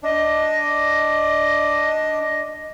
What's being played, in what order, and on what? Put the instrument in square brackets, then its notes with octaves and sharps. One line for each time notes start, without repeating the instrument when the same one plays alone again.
[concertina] D4 [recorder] D#5